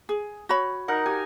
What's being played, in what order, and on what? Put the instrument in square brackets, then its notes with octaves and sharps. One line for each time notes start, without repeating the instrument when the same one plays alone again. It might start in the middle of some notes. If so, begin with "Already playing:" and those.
[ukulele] G#4
F#4 C#5 B5
[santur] D#4 A#4 F#5
G4 G#5